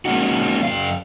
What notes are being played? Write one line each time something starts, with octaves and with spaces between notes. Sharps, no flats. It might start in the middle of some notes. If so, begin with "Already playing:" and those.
G#3 A#3 C#4 D#4 F#4
F#2 F3 F5